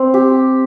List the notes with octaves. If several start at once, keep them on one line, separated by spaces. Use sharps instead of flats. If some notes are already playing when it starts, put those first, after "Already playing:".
Already playing: C4
G4